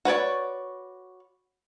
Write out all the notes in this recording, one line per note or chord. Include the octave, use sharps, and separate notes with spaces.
F#4 B4 C#5 D5